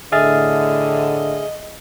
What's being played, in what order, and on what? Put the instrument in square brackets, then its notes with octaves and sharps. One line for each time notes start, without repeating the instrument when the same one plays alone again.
[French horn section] A2 D3 [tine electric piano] G#4 [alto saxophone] D#5 [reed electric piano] E5 F6 A6